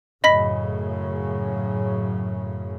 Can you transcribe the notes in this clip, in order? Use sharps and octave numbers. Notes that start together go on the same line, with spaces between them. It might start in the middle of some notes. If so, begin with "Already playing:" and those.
F#2 A2 C#3 D#5 B5 B6